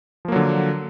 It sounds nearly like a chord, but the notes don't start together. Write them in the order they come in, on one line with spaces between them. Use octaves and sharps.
F3 A#3 F#3 D3